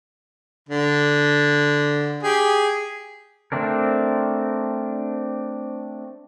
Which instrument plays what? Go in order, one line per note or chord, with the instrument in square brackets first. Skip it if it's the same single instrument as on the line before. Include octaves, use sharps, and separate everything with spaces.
[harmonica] D3
G4 G#4
[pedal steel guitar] A3 C4 D4 A#4